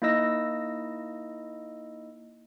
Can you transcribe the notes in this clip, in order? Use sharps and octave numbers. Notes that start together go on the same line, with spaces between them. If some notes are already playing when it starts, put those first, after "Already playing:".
A#3 D#4 E4 D#5 E6 A#6